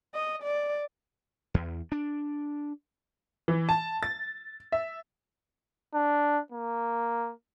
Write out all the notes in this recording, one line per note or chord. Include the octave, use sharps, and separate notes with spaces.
D#5
D5
E2
D4
E3
A5
A6
E5
D4
A#3